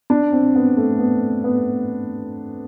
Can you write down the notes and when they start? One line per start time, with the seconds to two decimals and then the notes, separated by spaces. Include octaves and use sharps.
0.10 D4
0.32 C4
0.55 B3
0.77 A3
0.99 B3
1.44 B3